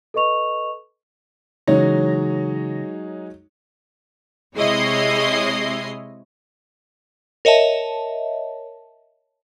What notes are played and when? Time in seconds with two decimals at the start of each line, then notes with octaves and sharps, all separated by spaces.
0.14 A4 B4 D#5 C#6 F7
1.67 C#3 E3 F#3 G#3 D#4 C#5 A#6
4.55 C3 G#3 E4 C#5 D#5 C7
7.45 A#4 C#5 D#5 E5 A5